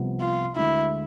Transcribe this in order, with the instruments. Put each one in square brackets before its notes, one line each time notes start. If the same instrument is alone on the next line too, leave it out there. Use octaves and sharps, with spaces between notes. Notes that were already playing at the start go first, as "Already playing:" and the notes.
Already playing: [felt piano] C2 C3 F3 B3
[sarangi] F4
[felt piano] D2 D3 G#3 [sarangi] E4